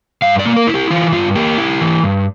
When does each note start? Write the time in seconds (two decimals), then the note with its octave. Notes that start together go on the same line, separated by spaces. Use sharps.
0.22 G2 F5
0.39 D5
0.45 A#3
0.56 A#4
0.67 E4
0.74 G4
0.90 E3 F4
1.12 G2 F4
1.35 A#3 G4
1.58 E4
1.81 E3
2.03 G2